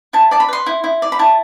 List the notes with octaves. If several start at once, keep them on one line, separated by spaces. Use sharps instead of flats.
E4 A5
D5 A5
B5
B4 C6
E4
E4
D5
B5
E4 A5